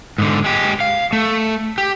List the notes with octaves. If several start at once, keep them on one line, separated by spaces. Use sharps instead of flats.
G#2 D3
G#3 G4
F5
A3
G4